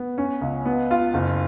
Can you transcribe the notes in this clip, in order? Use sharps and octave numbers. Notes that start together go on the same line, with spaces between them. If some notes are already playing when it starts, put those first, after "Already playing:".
Already playing: B3
C#4
C#2
B3
F4
F#1